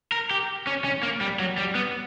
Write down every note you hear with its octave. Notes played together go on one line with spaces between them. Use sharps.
A#4
G4
C#4
C#4
A#3
G3
F#3
G3
B3